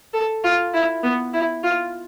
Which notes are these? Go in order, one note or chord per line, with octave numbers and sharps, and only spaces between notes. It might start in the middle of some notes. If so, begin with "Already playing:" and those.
A4
F4
E4
B3
E4
F4